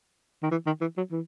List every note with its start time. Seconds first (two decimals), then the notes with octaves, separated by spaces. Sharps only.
0.43 D#3
0.51 E3
0.66 D#3
0.81 E3
0.97 F#3
1.11 E3